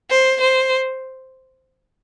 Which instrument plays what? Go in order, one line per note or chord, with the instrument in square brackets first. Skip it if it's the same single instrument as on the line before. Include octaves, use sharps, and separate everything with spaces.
[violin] C5
C5